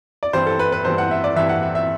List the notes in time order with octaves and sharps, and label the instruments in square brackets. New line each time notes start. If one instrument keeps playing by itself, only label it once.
[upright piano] D5
G2 E3 G3 C4 C5
A4
B4
B4
G2 E3 G3 C4 C5
F#5
E5
D5
G2 E3 G3 C4 E5
F#5
E5
E5